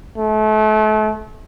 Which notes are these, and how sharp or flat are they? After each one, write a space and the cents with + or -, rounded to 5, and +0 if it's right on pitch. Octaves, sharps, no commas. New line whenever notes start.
A3 -35